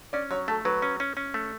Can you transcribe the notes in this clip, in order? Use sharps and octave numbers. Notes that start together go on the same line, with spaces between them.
C#4 D5
F#3 C#5
A3 A4
F#3 B4
C#4
C#4
C#4
A3